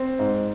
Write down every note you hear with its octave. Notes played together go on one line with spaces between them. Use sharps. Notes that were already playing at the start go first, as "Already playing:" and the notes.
Already playing: C4
G#2